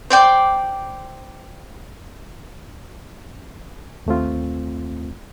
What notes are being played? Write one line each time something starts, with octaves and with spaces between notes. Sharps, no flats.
C5 D5 G5 D6
D#2 A3 C4 F4